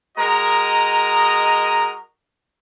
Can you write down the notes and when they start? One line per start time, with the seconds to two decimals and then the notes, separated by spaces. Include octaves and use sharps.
0.18 G#3 F#4 A#4 D#5 A#5